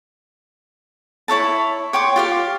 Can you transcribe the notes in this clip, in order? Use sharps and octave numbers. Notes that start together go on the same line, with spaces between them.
E4 C#5 E5 A5
C#5 G5 C6 D6
F4 G4 F5